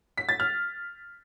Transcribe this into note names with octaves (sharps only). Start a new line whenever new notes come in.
B6
A6
F6